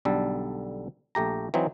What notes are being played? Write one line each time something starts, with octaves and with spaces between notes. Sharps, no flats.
B1 D3 G3 A4
A#1 A3 G4 A#5
E3 F#3 C4 D#4